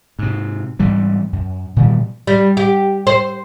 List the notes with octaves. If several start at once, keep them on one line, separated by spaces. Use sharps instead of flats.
G#2 C3
G#2 E3 G3
F#2
A#2 D#3 E3 G3
G3
G4
C5